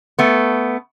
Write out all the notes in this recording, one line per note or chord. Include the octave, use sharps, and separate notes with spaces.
A3 B3